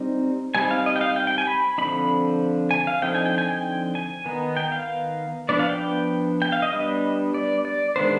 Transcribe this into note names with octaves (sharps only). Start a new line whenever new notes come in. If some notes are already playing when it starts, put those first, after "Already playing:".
Already playing: G3 C4 D#4
G3 C4 D#4 G#5
F5
D#5
G5
F5
G5
G5
G#5
B5
D3 F3 C4 D#4 B5
G#5
F5
D3 F3 C4 D#4 G5
G#5
G5
G#5
G5
G#5
D#3 B3 D#4
G5
F5
F3 B3 D4 D5
F5
G5
G5
F5
D#5
G3 B3 D4
D5
D5
D#3 G#3 B3 D4 C5